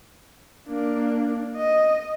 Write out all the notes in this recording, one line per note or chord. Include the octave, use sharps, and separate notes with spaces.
A#3 D4
D#5